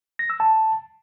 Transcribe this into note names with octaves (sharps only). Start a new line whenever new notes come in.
A#6
E6
A5